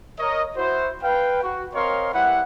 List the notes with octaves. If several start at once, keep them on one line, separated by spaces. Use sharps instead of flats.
A#4 C#5 D#5
E4 F#4 C5
B4 F5 G5
F#4
C4 A#4 C#5 D#5 F5 C6
G3 E4 B4 F#5